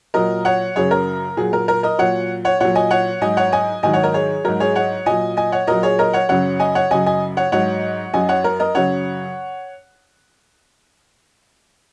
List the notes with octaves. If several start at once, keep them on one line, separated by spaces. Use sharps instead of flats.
A#2 F#3 A#4 D#5
C#5 F#5
F#2 C#3 F#3 G#4 C#5
A#4
A#2 F#3 G#4
A#4
A#4
A#4 D#5
A#2 F#3 C#5 F#5
C#5 F#5
A#2 F#3 C#5 F#5
D#5 G#5
C#5 F#5
G#2 F#3 D#5 G#5
C#5 F#5
D#5 G#5
G#2 D#3 F#3 D#5 G#5
C#5 F#5
A#4 D#5
G#4 C#5
G#2 F#3 A#4
G#4 C#5
C#5 F#5
A#2 F#3 D#5 G#5
D#5 G#5
C#5 F#5
A#2 F#3 A#4 D#5
G#4 C#5
A#4 D#5
C#5 F#5
F#2 C#3 F#3 C#5 F#5
D#5 G#5
C#5 F#5
F#2 C#3 F#3 D#5 G#5
D#5 G#5
C#5 F#5
G#2 F#3 C#5 F#5
F#2 F#3 D#5 G#5
C#5 F#5
A#4
A#4 D#5
F#2 C#3 F#3 C#5 F#5